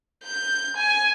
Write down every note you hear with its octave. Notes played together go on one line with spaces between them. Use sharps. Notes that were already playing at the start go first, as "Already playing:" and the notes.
G6
G#5